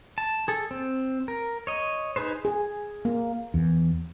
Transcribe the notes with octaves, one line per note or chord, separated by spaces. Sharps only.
A5
G#4 A4
C4
A#4
C#5 D#5
D#4 G#4 B4 C5
G#4
A#3
E2